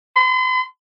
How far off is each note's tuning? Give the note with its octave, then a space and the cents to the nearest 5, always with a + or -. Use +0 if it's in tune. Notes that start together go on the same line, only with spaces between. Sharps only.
C6 -45